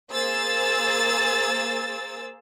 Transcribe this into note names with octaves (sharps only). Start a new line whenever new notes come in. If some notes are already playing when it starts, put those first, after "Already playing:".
A#3 G#4 C5 E6 A6